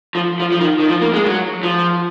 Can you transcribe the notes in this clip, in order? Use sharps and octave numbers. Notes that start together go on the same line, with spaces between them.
F3
F3
F3
D#3
D#3
F3
A#3
G#3
F#3
F3